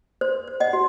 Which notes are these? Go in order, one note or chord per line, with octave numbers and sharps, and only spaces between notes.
C5
C5
D#5 F#5
F#4